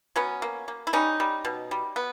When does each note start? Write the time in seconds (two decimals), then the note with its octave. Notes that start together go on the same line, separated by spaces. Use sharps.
0.16 F#3 B3 C#4
0.42 A#3
0.68 A#3
0.87 E4
0.93 G3 C#4 D#4
1.20 G3
1.45 B2
1.71 G3
1.96 B3